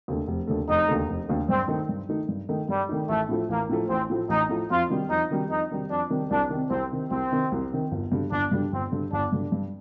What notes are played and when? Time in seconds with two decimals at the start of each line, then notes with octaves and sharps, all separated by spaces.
0.08 D#2 D3 A3
0.28 F1
0.47 D#2 D3 A3
0.69 F1 D#4
0.88 D#2 D3 A3
1.08 F1
1.29 D#2 D3 A3
1.49 G2 C4
1.68 D#3 A3 D#4
1.89 G2
2.09 D#3 A3 D#4
2.29 G2
2.49 D#3 A3 D#4
2.69 G2 G3
2.89 D#3 A3 D#4
3.09 A1 A3
3.29 A2 F3 A3
3.49 A1 A#3
3.69 A2 F3 A3
3.89 A1 C4
4.10 A2 F3 A3
4.29 A1 D#4
4.49 A2 F3 A3
4.70 F2 F4
4.90 C3 D#3 G3
5.10 F2 D#4
5.30 C3 D#3 G3
5.50 F2 D#4
5.71 C3 D#3 G3
5.90 F2 D4
6.10 C3 D#3 G3
6.31 C2 D4
6.50 D#3
6.55 C3
6.70 C2 C4
6.91 C3 D#3
7.11 C2 C4
7.32 C3 D#3
7.52 C2
7.72 C3 D#3
7.92 G1
8.12 G2 D3 G3
8.31 G1 D4
8.51 G2 D3 G3
8.72 G1 C4
8.92 G2 D3 G3
9.12 G1 D4
9.32 G2 D3 G3
9.52 G2